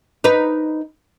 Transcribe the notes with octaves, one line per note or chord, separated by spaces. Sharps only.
D#4 B4